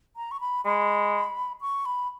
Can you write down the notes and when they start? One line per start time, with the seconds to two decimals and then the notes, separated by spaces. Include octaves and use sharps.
0.16 A#5
0.31 C#6
0.41 B5
0.65 G#3 B5
1.61 C#6
1.86 B5